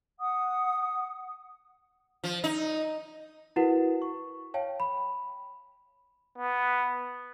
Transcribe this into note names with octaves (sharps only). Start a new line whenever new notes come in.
F#5 D#6
F3
D#4
E4 F#4 A#4 B4 F#5
C#6
C#5 F5 G5 A5
B5
B3